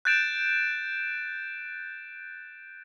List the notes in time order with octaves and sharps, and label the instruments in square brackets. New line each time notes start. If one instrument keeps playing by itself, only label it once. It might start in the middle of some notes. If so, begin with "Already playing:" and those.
[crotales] F#6 G6 A6 D7 E7